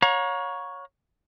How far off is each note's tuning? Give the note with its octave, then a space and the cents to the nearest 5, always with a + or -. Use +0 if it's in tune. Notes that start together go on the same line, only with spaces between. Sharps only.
C#5 +0 F5 +45 A#5 +25